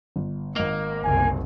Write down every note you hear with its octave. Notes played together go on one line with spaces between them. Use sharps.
G1
G#1 A#3 D#5
F#1 C2 G#5